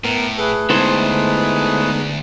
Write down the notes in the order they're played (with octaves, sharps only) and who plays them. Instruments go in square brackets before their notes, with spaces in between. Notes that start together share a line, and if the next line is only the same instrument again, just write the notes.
[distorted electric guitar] A2 [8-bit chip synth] B3 A#4
[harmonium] A3 G#4 B4 [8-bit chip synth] A4
[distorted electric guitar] D2 [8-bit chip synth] G#3 B3 D#4 [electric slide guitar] E4 A4 C5